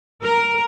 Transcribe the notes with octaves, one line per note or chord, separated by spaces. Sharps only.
A#4